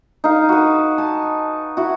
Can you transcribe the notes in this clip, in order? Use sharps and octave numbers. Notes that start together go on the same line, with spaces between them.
D#4 F5
F#4 B4
G#5 A5
E4 F#4